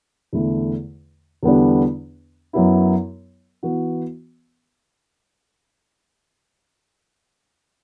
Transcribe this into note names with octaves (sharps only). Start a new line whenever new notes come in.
E2 D3 A3 E4
E2 D3 G3 B3 D4
F#2 F#3 B3 E4
E3 B3 F#4